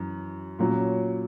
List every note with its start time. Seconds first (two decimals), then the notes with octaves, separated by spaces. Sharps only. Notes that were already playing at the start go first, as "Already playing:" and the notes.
Already playing: F#2 E3
0.59 A#2 F#3 C#4